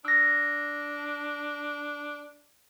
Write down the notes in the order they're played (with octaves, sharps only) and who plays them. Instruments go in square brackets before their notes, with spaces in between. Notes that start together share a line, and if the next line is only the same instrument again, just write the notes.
[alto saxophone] D4 [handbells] E6 A#6